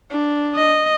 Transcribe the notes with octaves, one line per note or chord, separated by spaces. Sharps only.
D4
D#5